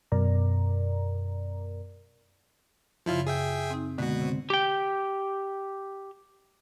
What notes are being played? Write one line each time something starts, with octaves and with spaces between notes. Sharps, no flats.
F#2 B2 A#4 D5 A#5
F#2 C#3 F3 E4 F4
G#4 E5 G5
C4 D#4
B2 D3 G#3 A#3 F#4
C3 C4
G4 G5